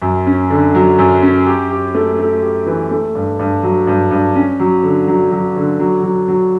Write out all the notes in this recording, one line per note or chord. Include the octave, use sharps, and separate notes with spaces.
F#2
C#4
D3
F#3
F#2
C#4
G4
G4
A3
A3
G4
E3
A3
G2
G2
F#3
G2
G2
C#4
F#3
D3
F#3
F#3
D3
F#3
F#3
F#3